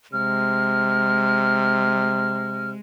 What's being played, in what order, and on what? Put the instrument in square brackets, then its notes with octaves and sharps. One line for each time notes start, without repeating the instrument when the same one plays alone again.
[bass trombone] C3 [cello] G#3 [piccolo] F6